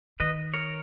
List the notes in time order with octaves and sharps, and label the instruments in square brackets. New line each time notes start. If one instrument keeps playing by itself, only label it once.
[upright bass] D#3 [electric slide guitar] B4 D#5
[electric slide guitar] A#4 C#5